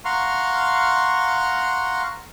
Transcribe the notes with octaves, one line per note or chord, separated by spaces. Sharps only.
F5 F#5 A#5 C6 C#6 F6